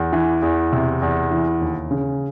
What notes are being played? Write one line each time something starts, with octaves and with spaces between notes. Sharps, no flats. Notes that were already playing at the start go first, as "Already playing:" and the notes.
Already playing: E2
E3
E2
C3
E2
E3
D#2
C#3